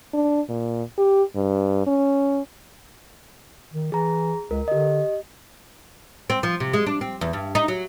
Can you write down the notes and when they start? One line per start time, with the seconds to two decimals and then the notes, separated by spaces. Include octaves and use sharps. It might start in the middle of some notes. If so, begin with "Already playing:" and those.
0.14 D4
0.49 A#2
0.98 G4
1.36 G2
1.87 C#4
3.73 D#3
3.92 E3 G#4 A#5
4.51 C#2 A#4
4.68 D3 G4 D#5
6.30 C4
6.43 F3
6.60 C3
6.73 G#3
6.86 D4
7.01 C4
7.21 E2
7.33 G2
7.55 D#4
7.68 F#3